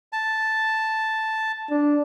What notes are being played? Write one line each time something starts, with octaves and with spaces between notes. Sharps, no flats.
A5
D4